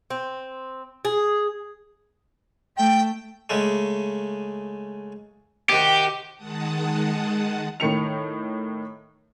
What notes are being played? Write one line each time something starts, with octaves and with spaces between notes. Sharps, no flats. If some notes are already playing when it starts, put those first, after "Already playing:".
C4
G#4
A3 G5
C#3 G#3 A3
C3 D#3 F#4 G4
D#3 G#3 F#5 A5 D#6
A2 D#3 C#7 F7